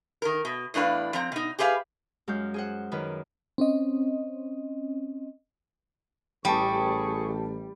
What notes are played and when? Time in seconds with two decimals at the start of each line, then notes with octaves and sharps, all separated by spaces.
0.22 D#3 A#4
0.45 B2
0.74 E2 A2 D4 B4 F5
1.13 F3 C4 A#5
1.32 B2 D#4
1.59 G4 G#4 B4 E5 F5
2.28 F#2 G#3 F#4 F5 G6
2.54 G#4 C5 F#5
2.92 F#2 D#3 B4
3.58 C4 C#4 D#5
6.45 A1 G3 G#4 G5 A5 C#6